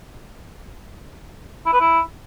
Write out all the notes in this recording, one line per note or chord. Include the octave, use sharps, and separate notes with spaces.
E4
B4
E4